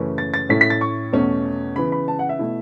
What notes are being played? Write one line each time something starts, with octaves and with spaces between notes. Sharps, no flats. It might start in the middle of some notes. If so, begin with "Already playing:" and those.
Already playing: F#2 C#3 E3 A3 C#4
A6
A6
A2 A3 C#4 E4 B6
B6
A6
C#6
E2 B2 A3 C#4
C#3 E3 B3 B5
B5
A5
F#5
E5
B2 A3 E4